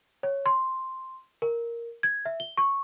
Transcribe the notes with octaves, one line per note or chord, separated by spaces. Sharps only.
C#5
C6
A#4
G#6
E5
G7
C#6